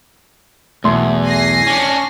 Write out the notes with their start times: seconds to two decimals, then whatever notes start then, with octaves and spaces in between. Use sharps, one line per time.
0.84 B1 E2 A3 C6
1.26 G#5 A#6 C7
1.67 C#4 D4